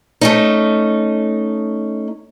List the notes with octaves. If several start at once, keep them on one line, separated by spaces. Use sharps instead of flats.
A3 C#4 D#4